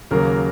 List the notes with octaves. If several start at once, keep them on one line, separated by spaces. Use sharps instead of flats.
D#2 C#3 F#3 A#3 A#4